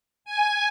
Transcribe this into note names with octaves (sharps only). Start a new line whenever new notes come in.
G#5